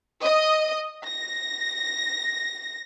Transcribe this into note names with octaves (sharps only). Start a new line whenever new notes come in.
D#5
A#6